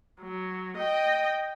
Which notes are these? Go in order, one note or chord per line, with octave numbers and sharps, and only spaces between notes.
F#3
D#5 G5